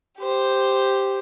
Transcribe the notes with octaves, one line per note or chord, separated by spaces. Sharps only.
G4 C5